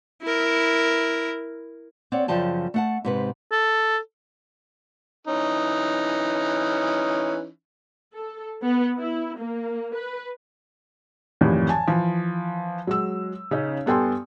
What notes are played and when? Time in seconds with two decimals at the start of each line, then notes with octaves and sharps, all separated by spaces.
0.22 E4 A#4
2.12 C4 C#5 D5 F#5
2.28 F#2 C#3 F3 G5 A5
2.74 A3 F#5 A5
3.05 G#2 C3 B4
3.51 A4
5.27 E3 C#4 D#4
8.15 A4
8.62 B3
8.97 E4
9.37 A#3
9.94 B4
11.41 G#1 F2 A2 C3 D#3 E3
11.69 G#5 A5
11.87 E3 F3
12.87 F#3 G#3 E6
13.51 C#3 C#4 D#4
13.86 G2 B3 A4 G5 G#5 C6